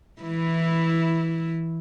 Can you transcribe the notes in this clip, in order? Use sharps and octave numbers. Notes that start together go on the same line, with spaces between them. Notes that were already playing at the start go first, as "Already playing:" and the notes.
E3 E4